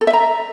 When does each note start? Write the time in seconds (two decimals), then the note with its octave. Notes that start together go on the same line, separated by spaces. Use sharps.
0.01 A4
0.07 E5
0.13 A#5